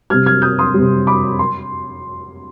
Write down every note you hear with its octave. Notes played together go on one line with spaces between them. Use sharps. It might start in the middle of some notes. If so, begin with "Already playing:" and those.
C3 G3 F6 G#6
F6 G#6
D#6 G6
C6 D#6
G3
C3
B5 D6
C6